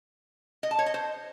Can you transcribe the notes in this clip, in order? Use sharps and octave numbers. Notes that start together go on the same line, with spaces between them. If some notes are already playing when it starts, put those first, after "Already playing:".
D#5
A5
C#5
D#5
C5